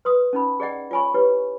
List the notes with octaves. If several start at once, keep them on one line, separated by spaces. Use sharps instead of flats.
B4 C6 D#6
C#4 D#4 B5
G#4 D5 D#5 F#5 G5
F4 C#5 G#5 B5 C#6
E4 G4 B4 C#5